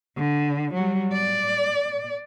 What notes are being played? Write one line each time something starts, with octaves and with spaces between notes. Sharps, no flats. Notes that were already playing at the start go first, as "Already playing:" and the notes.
D3
F#3 G3
D5